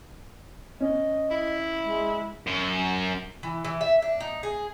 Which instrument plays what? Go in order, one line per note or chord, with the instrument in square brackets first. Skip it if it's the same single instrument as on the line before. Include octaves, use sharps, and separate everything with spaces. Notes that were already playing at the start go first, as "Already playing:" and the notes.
[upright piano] C#4 [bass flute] D#5
[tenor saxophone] E4
[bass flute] G#3
[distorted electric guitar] F#2
[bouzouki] E3
E3
E5
D4
D#4
G#4